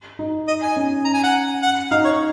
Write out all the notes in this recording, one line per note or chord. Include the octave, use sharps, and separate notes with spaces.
D#4
D#5
G#5
C#4
A#5
G#5
F#5
F#5
D#4 F5
C#5